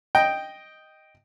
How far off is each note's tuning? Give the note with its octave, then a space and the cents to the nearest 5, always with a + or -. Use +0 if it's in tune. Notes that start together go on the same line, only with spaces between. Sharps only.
D#5 +0 G5 +0